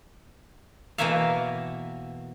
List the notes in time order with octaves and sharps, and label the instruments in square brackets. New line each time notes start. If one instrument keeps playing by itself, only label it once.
[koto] B2 E3 A#3 C#5 E5 F5